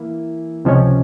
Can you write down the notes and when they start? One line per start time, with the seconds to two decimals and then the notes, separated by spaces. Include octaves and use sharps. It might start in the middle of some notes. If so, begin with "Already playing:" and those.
Already playing: E3 A#3 E4
0.65 C#2 C3 F3 G#3 C#4